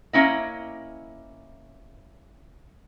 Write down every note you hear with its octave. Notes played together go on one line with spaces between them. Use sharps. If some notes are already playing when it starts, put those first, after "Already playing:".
A#3 C#4 E4 D#5